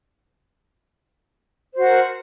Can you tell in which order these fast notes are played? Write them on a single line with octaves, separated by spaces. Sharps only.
C5 F#4 F#5 A#4